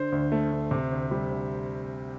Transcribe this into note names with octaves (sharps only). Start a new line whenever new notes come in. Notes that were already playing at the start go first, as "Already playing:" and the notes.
Already playing: D3 C5
D2
A3
D2
C3
D2
G3
D2